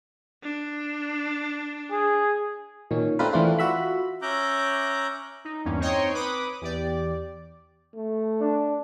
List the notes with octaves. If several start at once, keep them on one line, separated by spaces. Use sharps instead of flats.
D4
G#4
A#2 D#3 C#4
A3 C4 D4 F4 A#4 B4
E3 A3 C4 D4 F4
F4 F#4 E5 B5
C#4 E5 A#5 D6 F#6 G6
D#4
E2 G2 A#3 C#4
C4 D#4 C#5 D#5 G5 C6
B4 B5 D6 D#6
E2 G4 D5
A3
D4